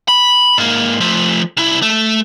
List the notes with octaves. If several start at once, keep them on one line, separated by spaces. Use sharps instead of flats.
B5
G#2 A#3
F3 A3
C2 E4
A3